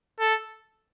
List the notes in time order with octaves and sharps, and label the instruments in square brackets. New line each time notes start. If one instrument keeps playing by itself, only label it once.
[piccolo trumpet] A4